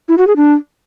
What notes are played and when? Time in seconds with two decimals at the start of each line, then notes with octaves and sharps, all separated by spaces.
0.08 E4
0.18 F#4
0.27 G#4
0.36 D4